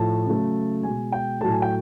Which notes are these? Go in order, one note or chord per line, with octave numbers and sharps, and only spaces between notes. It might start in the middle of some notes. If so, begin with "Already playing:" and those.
Already playing: A2 F3 A3 A5
C#3 F#3 A3
B2 G#3 G#5
G5
A2 F#3 A3 A5
G#5
G5